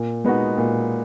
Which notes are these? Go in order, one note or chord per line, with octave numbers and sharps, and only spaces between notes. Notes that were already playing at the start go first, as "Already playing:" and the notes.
Already playing: A#2
G#3 B3 D#4 F#4
A#2